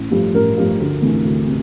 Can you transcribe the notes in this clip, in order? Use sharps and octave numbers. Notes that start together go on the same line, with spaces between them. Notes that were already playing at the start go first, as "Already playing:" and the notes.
Already playing: A1
G2 F3 A3
A1 A#4
G2 F3 A3
D2
C3 E3 A3
D2
C3